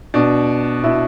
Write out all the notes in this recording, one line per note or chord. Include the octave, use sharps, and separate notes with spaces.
B2 D4
B2 E4